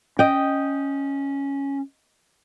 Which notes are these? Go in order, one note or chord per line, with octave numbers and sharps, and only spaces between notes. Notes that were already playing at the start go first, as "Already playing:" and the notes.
C#4 D#5 G5